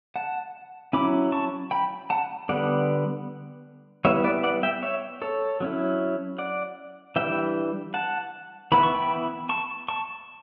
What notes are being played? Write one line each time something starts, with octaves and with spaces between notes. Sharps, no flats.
F#5 A5
F#3 C#4 E4 B5 D6
A5 C#6
G5 B5
F#5 A5
D3 G3 B3 D5 F#5
G3 B3 E4 C#5 E5
B4 D5
D5 F#5
E5 G5
C#5 E5
A4 C#5
F#3 C#4 E4
D5 F#5
E3 G3 D4 E5 G5
F#5 A5
E3 B3 E4 B5
C#6
G5 B5
A5 C#6
A5 C#6